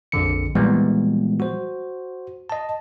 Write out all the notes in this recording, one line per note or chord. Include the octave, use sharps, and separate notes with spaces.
A#1 F2 D3 C#7
A#2 E3 F3 G3 G#3 B3
F#4 C5
D#5 A5